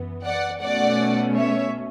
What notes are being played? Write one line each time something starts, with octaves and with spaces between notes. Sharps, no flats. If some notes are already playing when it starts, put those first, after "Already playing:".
Already playing: F#2 E3 B3
D5 F#5
B2 A3 C#4 D5 F#5
C#5 E5